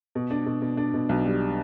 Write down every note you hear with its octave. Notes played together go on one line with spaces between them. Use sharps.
B2
D4
B2
B2
D4
B2
B1
G3